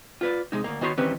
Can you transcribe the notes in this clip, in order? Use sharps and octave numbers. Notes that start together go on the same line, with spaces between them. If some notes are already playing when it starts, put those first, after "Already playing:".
F4 B4 D5
C3 G#3 D#4
D2 G2 A#3
D#3 B3 F#4 C#5 A5 C6
D#3 E3 G3 C4 C#4 B4